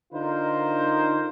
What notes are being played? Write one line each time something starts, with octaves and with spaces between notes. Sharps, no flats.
D3 D#4 F4 A#4 C5